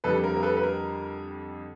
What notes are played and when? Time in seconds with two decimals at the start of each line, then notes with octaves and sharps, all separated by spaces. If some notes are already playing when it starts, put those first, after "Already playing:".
0.04 F2 D3 G3 A4 B4
0.24 A#4
0.37 A#4
0.43 A4 B4
0.57 B4
0.63 A#4